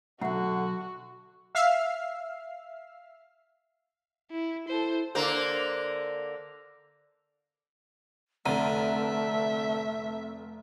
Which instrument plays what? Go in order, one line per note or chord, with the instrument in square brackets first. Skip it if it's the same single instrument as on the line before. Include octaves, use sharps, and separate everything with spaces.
[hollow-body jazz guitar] B1 G2 [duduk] D3 [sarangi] F#4 [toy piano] E5 F#5 A#5
[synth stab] E5 F5 E6 F6 C7
[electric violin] E4
[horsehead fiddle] E4 A4 [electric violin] C5
[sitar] D3 A#3 C5
[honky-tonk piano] F1 A#5 D#7 [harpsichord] D3 [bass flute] A3 [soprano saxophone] E5